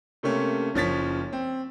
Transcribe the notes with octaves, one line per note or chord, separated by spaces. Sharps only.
C3 A3 A#3 C#4
F#1 F3 C#4 A6 B6
C4